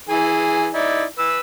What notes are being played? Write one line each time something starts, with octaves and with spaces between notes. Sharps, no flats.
E3 G#4 G#5
D#4 E4 D5
B4 E6